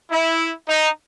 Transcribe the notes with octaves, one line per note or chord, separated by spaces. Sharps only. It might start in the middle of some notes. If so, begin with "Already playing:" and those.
E4
D#4